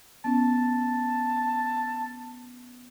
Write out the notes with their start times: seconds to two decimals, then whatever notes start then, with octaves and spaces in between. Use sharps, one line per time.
0.25 B3 C#4 A5